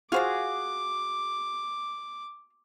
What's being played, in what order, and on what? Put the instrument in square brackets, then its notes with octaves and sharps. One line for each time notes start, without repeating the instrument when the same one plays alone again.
[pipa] F4 C5 F5 [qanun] F#4 G#4 [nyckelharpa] D6